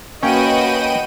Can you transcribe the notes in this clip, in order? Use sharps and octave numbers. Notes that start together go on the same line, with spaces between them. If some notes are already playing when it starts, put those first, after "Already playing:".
A#3 C#4 F#4 B4 C#5 D#5 G5 D#7